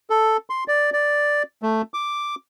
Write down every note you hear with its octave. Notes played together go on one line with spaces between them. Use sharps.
A4
C6
D5
D5
A3
D6